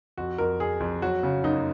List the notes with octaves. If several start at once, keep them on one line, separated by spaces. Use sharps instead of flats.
F2 F#4
F2 A#4
F2 G#4
F2
F#3 F#4
C#3
F#2 D#4